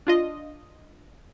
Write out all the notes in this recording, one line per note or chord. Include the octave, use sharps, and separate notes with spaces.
D4 F4 D#5